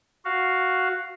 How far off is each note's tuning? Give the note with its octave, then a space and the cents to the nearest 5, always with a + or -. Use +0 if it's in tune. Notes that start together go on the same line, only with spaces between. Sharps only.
F#4 +0 F5 +0